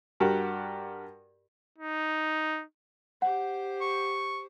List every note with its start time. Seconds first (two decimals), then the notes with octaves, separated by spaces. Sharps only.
0.20 G2 F#4 G4 A#4 F#5
1.78 D#4
3.22 G4 C5 F#5
3.81 C#6